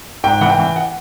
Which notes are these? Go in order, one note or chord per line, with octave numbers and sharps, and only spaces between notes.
G#2 G5
E3 F#5
G5
E3
F#5